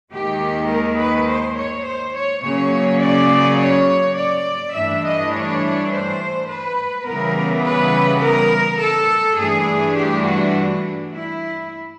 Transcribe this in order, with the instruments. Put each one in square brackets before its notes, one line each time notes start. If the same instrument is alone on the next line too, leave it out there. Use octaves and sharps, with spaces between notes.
[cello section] D#2 D#3 G#3 G4
A#4
B4
C5
C#5
C5
C#5
C#3 F#3 A#3 C#5
D5
C#5
D5
G2 E3 A3 D4 E5
D#5
C#5
C5
B4
C#3 E3 G3 B3 A#4
B4
A#4
A4
G2 E3 A3 D4 G#4
G4
F#4
E4